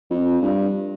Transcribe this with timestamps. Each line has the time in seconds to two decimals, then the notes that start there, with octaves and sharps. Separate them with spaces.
0.11 F2
0.42 G2